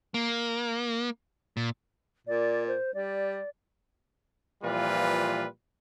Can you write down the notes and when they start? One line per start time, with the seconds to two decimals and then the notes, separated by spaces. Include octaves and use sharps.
0.14 A#3
1.57 A#2
2.27 A#2 D5
2.68 C5
2.94 G3 D5
4.63 A#2 E3 F3 G3 F4 B4